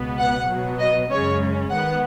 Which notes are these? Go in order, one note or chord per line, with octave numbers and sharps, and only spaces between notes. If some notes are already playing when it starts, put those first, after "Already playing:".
Already playing: C#2 B2 B3
F#5
B2 F#3 B3
D#5
F#2 C#3 G#3 C#4 C#5
G#2 D#3 B3 F#5